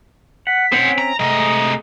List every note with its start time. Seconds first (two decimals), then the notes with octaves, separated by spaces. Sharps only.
0.47 F#5 B6
0.72 C4 C#4 C5 F#5
0.98 A#5
1.20 C3 G#3 A3 G#4 D#5 A#5